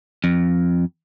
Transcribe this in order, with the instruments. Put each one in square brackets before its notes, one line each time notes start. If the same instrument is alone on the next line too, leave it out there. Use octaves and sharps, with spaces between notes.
[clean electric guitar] F2